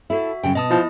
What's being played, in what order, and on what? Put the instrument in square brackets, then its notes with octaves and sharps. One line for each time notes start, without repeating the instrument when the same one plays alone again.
[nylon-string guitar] E4 A4 [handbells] F#4 E5
[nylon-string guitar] F#2 C#3 G5
[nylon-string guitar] B2 [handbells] D#5 A5 D#6
[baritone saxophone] F3 [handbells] E4